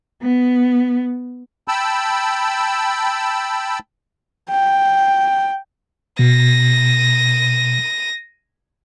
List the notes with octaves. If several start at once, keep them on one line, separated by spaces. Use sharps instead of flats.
B3
G5 A5 B5 E6
G5
B2 A#6 D#7